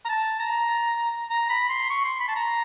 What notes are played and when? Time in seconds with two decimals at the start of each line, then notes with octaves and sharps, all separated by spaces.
0.05 A#5
0.09 A5
0.39 A#5
1.30 A#5
1.50 B5
1.69 C6
1.90 C#6
2.05 C6
2.20 B5
2.28 A5
2.35 A#5